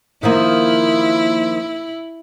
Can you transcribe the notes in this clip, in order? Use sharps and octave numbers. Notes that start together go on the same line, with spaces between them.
D#3 F3 A#3 E4